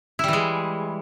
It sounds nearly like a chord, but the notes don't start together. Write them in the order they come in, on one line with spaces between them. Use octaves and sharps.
E4 G3 E3 G#3